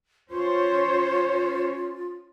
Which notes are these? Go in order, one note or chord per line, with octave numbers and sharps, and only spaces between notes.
C#4 F4 C5 C#5